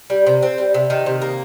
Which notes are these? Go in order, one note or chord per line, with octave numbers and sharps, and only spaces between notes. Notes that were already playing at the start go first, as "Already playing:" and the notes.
G3
C3
C4
G3
C3
D#3
C3
A#3